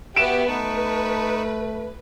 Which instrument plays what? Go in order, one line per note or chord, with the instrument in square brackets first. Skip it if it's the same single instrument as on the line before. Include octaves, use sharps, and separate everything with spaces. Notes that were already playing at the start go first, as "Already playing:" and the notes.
[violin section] B3 G4 E5 [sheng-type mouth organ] F#4 [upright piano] D7 E7
[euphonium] A3 [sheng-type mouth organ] D#4 A5 C#6 [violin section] B4